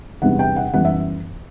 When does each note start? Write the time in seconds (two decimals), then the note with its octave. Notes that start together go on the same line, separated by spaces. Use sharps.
0.22 E2 C3 G3 B3 D4 F#5
0.39 G5
0.56 F#5
0.73 F#2 E3 G3 B3 F#5
0.85 E5